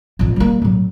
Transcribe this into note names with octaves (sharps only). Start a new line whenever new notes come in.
A1 F2
G3 A#3
A2 F#3